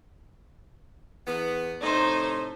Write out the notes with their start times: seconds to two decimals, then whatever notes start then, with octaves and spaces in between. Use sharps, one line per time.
1.27 E2 B3
1.81 A2 C3 A3 D#4 C5